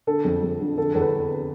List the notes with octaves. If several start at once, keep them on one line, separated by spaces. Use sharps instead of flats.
D3 A4
F2
F2
D3
D3 A4
E2 A4
B4